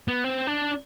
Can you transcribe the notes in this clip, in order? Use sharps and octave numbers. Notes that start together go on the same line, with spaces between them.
B3
C4
D4